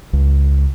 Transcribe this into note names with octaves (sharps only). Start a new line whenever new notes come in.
C#2